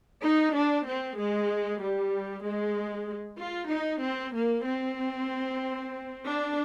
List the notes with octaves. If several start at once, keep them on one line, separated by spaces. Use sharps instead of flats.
D#4
D4
C4
G#3
G3
G#3
F4
D#4
C4
A#3
C4
D4